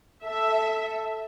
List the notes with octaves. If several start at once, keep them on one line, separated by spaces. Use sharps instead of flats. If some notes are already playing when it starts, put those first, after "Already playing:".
A4 E5